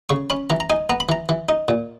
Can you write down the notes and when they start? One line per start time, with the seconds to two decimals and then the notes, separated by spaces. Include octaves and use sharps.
0.09 C#3 C#6
0.30 C#4 B5
0.50 E3 A#5
0.60 A#5
0.70 D#4 G#5
0.90 B3 A#5
1.00 B5
1.09 E3 A#5
1.29 E3
1.49 D#4
1.68 A#2